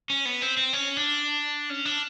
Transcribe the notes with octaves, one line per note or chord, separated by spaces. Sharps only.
C#4
B3
C4
C4
C#4
D4
C#4
D4